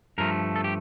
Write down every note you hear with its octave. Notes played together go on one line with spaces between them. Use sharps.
G2 F3 A3 A#4
A4
G4